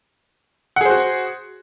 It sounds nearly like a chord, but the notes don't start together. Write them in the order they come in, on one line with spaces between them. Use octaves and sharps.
F#5 G#4 C5 F#4